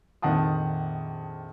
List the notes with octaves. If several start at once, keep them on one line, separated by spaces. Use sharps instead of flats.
A#1 F2 D#3 F#5 A5 D#6